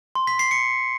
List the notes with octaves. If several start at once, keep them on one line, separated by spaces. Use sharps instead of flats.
C6
B6
C7
C#7